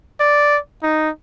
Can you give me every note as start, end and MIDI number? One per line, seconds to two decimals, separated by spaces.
0.21 0.58 74
0.83 1.10 63